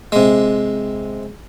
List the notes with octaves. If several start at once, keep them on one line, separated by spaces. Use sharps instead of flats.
C3 G#3